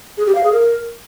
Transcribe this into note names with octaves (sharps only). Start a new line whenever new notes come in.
G#4
G4
F5
G#4
A#4